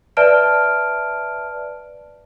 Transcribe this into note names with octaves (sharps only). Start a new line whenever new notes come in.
B4 D5 E5 A5 F6 D7